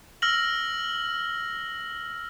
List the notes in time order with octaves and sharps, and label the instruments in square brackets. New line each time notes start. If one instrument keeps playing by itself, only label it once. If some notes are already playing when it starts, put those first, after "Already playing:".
[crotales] E6 F6 A#6 F#7